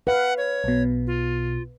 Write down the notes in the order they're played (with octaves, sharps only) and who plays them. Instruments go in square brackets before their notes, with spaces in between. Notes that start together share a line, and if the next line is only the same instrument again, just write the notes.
[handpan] B4 F5 [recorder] F#5
[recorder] C#5
[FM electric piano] B1 B2
[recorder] F4